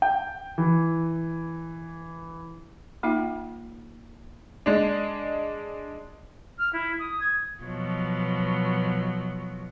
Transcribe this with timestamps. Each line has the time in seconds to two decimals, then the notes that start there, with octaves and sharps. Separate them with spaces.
0.02 G5
0.58 E3
3.03 A#3 D#4 F4 E5 G5
4.66 G#3 D4
6.58 F6
6.72 E4
6.99 D#6
7.20 G#6
7.63 B2 F3 F#3